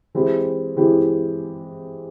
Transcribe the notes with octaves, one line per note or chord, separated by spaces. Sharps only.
E3 G#3 C4 E4 G4
E3 G#3 C4 E4 G4